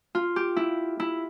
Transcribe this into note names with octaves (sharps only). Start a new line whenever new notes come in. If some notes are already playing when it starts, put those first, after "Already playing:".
F4
G4
E4
E4